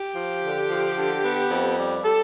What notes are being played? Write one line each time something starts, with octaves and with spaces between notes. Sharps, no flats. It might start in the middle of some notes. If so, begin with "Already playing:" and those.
Already playing: G4
F3
D3
F3
D3
B3
F2
G3
G3 A4